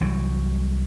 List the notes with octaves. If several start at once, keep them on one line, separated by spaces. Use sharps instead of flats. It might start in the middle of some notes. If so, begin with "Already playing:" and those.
C2 E3 F#3 G3